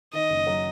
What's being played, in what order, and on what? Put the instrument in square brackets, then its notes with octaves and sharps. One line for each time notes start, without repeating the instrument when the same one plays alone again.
[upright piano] D#3 [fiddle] D#5
[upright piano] F#1
F#3